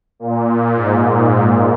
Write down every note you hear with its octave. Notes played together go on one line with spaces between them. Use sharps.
A#2
G#2